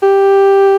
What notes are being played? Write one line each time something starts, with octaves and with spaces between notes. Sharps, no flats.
G4